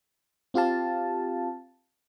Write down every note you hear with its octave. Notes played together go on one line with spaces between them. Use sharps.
C4 F4 G4 F5 A5